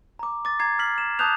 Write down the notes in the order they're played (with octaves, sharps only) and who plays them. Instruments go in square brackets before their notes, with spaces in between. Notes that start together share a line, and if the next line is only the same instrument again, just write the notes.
[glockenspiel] A#5 D6
D6 A6
A#5 G#6 C7
F6 B6 C7 F#7
E7
A5 D6 D#6 F#6 G6 F7